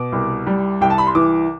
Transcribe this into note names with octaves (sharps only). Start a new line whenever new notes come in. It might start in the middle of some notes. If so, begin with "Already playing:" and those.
Already playing: B2 D6
C2
G3
C2 G5
A5
B5
C6
E3 D6